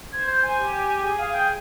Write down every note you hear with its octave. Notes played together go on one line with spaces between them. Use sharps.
C5 G#6
G6
G#5
G4
G#4
F5
G5